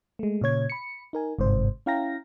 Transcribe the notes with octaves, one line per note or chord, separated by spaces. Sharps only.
G#3 A3
A#2 C#3 C#5 G#6
B5 C#7
D#4 A#4 G#5
G1 G#2 C3 C5
C#4 E4 F5 G5 A#5 A#6